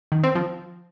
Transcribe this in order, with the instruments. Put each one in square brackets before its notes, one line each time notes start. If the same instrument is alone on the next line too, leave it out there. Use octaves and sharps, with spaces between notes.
[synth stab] D#3
C4
F3